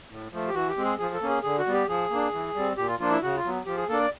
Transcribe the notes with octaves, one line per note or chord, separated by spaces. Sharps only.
A2
F3 A3
G4
E3 F#4
G4
G#3 C4
G#4
F3 G#4
A4
A#3 C#4
G#4
D3 G#4
F#4
G3 B3
G4
F3 G#4
A#3 D4
E3
G3 C4
A#2 G4
F4
F3 A#3 D4 F4
E4
C#3 F#4
F4
F#3 B3
F3 G4
G#4
A#3 D4 A4
D5